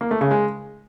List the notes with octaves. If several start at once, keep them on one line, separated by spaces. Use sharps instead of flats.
A#3
A3
C#3
G#3